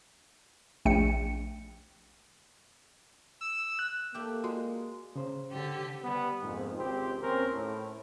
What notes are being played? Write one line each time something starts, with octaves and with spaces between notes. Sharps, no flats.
A#1 A3 G5 C#7
E6
F#6
A3 A#3 G4
G#3 F#4
C#3 C5
D3 G4
G3 B3
A#1 F2 G#2
G#1 C#2 C4 G4 C5
D#2 C4 C#4 A#4 C5
A2